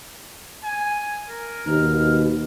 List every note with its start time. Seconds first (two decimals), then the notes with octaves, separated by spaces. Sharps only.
0.64 G#5
1.29 A#4
1.67 D#2 B2 F6